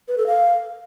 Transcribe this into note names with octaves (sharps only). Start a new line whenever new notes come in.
B4
A4
F5